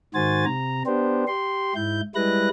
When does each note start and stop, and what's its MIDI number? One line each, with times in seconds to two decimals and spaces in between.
0.15 0.45 44
0.15 0.45 51
0.15 0.45 66
0.15 0.45 72
0.15 0.45 80
0.15 0.45 93
0.45 0.83 48
0.45 0.83 82
0.86 1.24 59
0.86 1.24 62
0.86 1.24 67
0.86 1.24 72
1.27 1.73 67
1.27 1.73 84
1.75 2.01 44
1.75 2.01 64
1.75 2.01 91
2.15 2.49 55
2.15 2.49 56
2.15 2.49 64
2.15 2.49 71
2.15 2.49 90
2.15 2.49 94